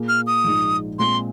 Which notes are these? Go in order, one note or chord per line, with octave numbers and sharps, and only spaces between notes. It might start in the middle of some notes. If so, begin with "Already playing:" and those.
Already playing: A#2 A#3 G#4
F6
D#6
A#1 G#2 G#3 D#4
A#2 G#3 C4 G#4 C6